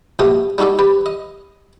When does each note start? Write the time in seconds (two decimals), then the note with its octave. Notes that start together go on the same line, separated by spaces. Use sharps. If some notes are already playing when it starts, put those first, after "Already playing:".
0.19 A#1 B2 A3 G4 D#6
0.58 G3 D#4 F#4 A4 D5
0.79 G4 B4
1.06 D#5